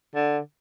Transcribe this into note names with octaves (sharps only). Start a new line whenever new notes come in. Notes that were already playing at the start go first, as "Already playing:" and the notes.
D3